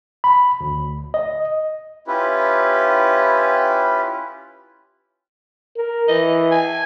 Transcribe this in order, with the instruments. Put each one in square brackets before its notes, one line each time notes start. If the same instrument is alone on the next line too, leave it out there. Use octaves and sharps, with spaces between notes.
[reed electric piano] B5
D2
D#5
[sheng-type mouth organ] C#4 E4 F4 G4 B4
[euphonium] A#4
[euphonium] E3 [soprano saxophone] D#5
[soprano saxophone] G#5